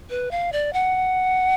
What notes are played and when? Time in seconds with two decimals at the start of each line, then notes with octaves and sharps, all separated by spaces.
0.10 B4
0.31 F5
0.52 D5
0.73 F#5